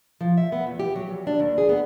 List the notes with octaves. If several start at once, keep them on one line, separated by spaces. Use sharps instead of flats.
F3
E5
B3
E2
G4
F#3
E2
D4
D#2
G#4
B3